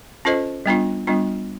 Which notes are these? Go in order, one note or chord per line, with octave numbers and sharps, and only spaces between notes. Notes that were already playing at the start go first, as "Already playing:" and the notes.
C#4 F4 A4 C5 D#5
G3 B3 D4 F4
G3 B3 D4 F4